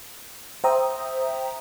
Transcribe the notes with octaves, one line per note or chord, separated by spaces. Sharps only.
C5 E5 G5 A#5 D#6